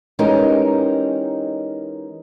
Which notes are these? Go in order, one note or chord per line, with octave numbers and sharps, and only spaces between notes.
E3 G#3 C#4 D#4 G4 A#4